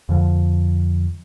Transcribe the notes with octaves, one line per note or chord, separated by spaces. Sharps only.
F2 D3 F3